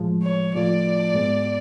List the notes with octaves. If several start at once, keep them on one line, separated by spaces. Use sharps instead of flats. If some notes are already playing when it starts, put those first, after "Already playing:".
Already playing: A2 F3 G#3
C#5
A2 F3 A3 F4 D5
G#2 G#3 B3